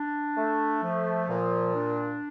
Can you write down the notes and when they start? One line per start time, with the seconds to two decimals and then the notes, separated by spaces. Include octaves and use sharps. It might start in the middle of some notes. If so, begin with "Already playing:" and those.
Already playing: D4
0.37 A3
0.83 F3
1.29 A#2
1.74 D4